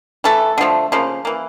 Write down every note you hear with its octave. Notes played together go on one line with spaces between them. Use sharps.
E3 A3 A4
D3 F3 A3
C#3 F3 A#3
E3 A#3